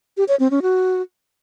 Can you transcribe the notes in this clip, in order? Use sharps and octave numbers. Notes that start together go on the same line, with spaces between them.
G4
C#5
C4
C#4
F#4